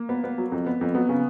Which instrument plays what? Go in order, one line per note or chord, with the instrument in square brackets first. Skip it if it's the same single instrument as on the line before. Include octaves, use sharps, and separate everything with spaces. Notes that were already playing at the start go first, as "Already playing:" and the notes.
Already playing: [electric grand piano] A#3
[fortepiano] B3
B3
F#3
F2
B3
F2
[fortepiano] F#3 [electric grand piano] B3
[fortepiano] C#3